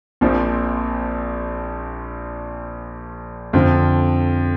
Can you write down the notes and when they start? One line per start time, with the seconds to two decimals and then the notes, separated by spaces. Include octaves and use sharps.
0.21 A#1 A#2 F3 C4
3.53 F2 D3 F3